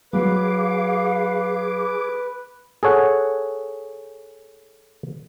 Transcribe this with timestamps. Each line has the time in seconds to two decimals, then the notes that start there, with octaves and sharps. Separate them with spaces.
0.13 F#3 G#4 B4 F5 D6
2.83 G#4 A4 C#5 F#5